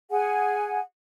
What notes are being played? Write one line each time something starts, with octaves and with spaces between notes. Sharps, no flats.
G#4 F#5 G#5